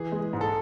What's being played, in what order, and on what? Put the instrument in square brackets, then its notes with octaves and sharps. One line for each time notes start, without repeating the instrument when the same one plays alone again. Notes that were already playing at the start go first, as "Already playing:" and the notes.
Already playing: [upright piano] E3 [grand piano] G#4
[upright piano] G#3
G#2
[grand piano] A4